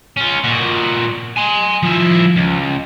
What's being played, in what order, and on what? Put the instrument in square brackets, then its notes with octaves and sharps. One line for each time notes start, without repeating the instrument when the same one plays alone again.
[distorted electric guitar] C#4 F4
A#2 F#4
G#5 C6
F3 E4
C#2